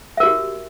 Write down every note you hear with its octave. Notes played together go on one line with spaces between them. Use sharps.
F#4 G4 A#4 E5